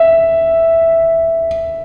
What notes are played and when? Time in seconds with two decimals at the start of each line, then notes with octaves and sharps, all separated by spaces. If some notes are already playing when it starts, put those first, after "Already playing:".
Already playing: E5